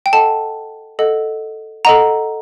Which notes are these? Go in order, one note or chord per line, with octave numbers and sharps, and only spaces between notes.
G5
A4 D#5 F#5 A5
A4 D#5 F#5
A4 D#5 F#5 A#5